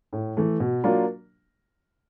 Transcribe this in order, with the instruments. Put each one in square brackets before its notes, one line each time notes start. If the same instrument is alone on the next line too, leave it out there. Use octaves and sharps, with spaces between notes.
[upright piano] A2
E3 A3
B2
F#3 A#3 D4 F4